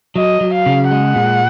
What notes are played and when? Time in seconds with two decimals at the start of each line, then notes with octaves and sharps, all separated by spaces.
0.16 F#3 D#5
0.41 F#3
0.54 F5
0.66 C#3
0.91 G#3 F#5
1.16 A#2